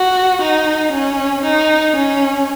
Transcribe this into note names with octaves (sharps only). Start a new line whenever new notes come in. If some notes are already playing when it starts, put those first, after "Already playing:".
Already playing: F#4
D#4
C#4
D#4
C#4